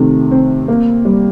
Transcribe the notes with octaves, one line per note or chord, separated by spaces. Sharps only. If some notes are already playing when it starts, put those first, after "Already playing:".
Already playing: C3 D#3 A3
C4
A#3
G3